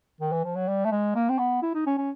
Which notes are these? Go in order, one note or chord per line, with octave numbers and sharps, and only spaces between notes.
D#3
E3
F3
F#3
G3
A3
G#3
A#3
C4
B3
E4
D#4
C#4
C#4